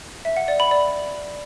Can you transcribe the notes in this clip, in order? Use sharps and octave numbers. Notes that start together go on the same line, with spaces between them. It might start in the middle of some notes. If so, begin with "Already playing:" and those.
E5
F#5
D5
B5
D5